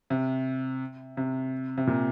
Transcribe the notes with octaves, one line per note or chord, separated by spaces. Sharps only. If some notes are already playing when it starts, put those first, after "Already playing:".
C3
C3
C3
A#2